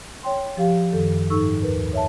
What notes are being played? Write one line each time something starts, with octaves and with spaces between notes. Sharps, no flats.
C#5 G5 C6
F3 G4 F5
F#2 D#3 A4
G#2 D#4 A4 C#6 E6
D#2 A#4 B4
C#5 E5 A5